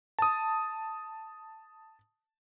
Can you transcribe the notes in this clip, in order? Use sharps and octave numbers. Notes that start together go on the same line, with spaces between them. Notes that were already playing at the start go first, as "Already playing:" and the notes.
A5 D#6